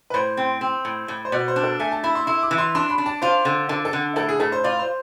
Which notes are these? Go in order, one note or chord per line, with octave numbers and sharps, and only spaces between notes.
B4
A2 C5
C4
C4
A2
A2
C5
B2 D5
C5
D4
A4
A3 G#5
A5
E4 B5
C6
E4 C6
D6
E3
C6
D4 C6
B5
D4
A5
F4 C5
D3
D3 A4
A4
D3
A2 A4
G#4
A2 A4
C5
F4 D5
C5